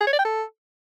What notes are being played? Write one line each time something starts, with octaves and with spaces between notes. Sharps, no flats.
G#4
C#5
D5
G5
A4